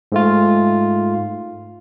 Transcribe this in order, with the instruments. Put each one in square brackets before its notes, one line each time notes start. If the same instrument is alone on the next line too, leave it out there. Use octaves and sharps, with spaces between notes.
[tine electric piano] G#2 A3 F4